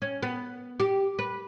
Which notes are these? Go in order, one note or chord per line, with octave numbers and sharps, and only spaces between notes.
C#4
B3
G4
B4